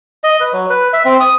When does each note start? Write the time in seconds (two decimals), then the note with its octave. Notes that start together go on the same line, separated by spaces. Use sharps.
0.24 D#5
0.40 B4
0.53 F#3
0.70 B4
0.93 E5
1.05 C4
1.20 D#6